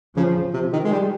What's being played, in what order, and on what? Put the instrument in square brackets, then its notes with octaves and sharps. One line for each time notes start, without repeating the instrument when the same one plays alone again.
[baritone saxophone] C#3 [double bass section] F3
[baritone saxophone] C3
D#3
G#3
G3